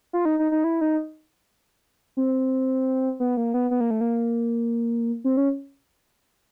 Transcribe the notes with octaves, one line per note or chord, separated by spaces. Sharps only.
F4
D#4
D#4
D#4
E4
D#4
C4
B3
A#3
B3
B3
A#3
A3
A#3
C4
C#4